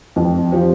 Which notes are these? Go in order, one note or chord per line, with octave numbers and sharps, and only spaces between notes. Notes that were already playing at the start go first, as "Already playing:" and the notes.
F2
F3 C4 G4